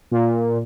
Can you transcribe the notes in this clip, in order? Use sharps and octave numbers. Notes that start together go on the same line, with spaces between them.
A#2